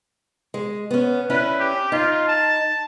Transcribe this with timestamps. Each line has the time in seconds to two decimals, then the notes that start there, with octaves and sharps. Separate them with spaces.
0.54 G#3
0.91 B3 C#4
1.30 C#4 D4 E4 B4
1.59 G4
1.92 D#4 F4
2.28 A5